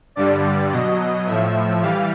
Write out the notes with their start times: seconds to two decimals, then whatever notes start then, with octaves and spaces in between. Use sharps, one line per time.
0.16 G2 D3 G3 D5
0.72 B2 F#3 D#5
1.27 A2 F3 E5
1.81 E3 G3 F5